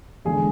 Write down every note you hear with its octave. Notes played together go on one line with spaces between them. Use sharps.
E2 D3 G#3 G#4